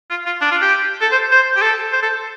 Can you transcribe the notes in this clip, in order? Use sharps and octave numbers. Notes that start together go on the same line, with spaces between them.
F4
F4
D4
F4
G4
A4
C5
C5
G4
A4
C5
A4